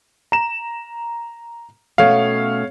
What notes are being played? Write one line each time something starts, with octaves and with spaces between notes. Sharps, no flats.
A#5 E7
B2 A3 C#4 C#5 F5